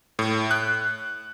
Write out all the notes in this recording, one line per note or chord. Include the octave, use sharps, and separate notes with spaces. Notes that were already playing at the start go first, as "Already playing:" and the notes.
A2
F#6